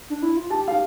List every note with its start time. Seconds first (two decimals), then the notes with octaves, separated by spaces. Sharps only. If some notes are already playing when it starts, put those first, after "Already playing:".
0.10 D4
0.23 E4
0.37 F4
0.50 G4 A5
0.68 F5